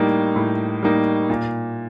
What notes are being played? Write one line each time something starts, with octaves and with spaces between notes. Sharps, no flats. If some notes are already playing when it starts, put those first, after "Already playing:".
Already playing: A2 G3 A#3 D#4
A2
G3 A#3 D#4
A#2